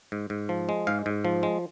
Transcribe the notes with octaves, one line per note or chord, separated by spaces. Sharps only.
G#2
G#2
F3
G#3
G#2 F5
G#2
F3
G#3